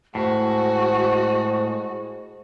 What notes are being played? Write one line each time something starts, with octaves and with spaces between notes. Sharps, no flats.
A2 G#3 F#4 C5